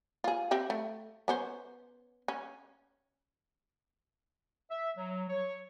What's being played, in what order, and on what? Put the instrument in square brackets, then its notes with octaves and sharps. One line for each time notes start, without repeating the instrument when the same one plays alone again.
[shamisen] F4 G#4
C4 G4 E5
A3
B3 C#4 C5
C#4
[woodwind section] E5
F#3
C#5